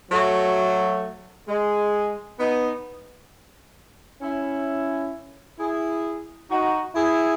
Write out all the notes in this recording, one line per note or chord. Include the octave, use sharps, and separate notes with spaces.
F#3 A3
G#3
B3 D#4
C#4 E4
E4 G#4
D#4 F#4
E4 G#4